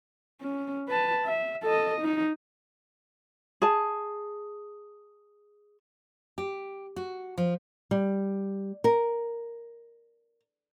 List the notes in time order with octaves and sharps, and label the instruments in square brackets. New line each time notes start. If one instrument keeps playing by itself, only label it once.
[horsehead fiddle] C#4
B4 A5
E5
A4 D#5
D#4
[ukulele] G#4 A5
[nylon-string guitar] G4
F#4
F3
G3
A#4